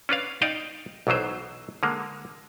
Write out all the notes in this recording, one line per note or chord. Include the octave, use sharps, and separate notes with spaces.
C#4 D4 B4 F5
D#4 D5 D#5 F5 G5
B1 B2 E3 F#3 C5
D3 G#3 A#3